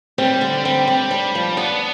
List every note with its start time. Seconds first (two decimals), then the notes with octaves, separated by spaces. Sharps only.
0.18 G3 C4
0.41 D3
0.65 G3 C4
0.87 C4
1.11 D4
1.35 F3
1.57 B3 D4